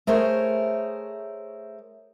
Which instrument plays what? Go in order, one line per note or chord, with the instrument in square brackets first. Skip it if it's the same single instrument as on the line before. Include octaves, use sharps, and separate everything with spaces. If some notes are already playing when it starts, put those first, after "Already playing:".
[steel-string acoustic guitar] A3 G#4 A#4 C5 C#5